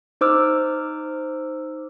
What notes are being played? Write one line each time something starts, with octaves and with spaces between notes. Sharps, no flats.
D#4 C5 D6 E6 F6